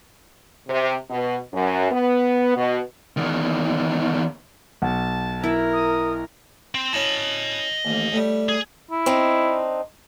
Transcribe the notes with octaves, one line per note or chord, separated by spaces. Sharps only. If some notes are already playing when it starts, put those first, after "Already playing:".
C3
B2
F#2
B3
B2
E2 D#3
B1 F#5 A5
E4 A#4
D#6
C4
C#4 E4 D#5 A5
A1 D#2
A2 G3
G#4
E4
C4 D4 D#4